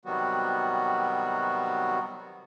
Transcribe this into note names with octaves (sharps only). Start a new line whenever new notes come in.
C3 D#3 F#3 G3 B3 F#4